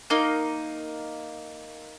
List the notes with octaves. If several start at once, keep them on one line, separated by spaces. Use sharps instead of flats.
A#3 D#4